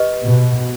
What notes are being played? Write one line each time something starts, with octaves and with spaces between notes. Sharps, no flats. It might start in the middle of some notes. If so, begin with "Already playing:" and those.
Already playing: G4 B4 D#5
B2